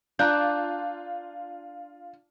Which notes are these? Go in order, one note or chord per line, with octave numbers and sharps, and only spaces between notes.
D4 F4 A#5 F#6 G6